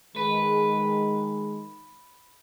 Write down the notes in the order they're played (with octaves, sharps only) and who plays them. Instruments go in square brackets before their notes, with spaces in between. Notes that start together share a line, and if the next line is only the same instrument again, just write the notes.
[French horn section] D#3 G#3 [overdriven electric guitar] B4